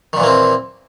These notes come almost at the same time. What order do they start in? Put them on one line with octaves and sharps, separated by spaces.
D#3 A#2 E3 A#3 C4